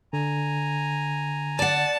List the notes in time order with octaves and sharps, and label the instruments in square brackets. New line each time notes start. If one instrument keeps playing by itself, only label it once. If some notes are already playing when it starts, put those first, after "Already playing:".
[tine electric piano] D3 [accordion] G#5 A#5
[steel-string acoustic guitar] D5 F#5 [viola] A5